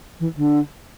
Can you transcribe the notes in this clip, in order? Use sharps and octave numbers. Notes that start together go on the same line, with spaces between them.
E3
D3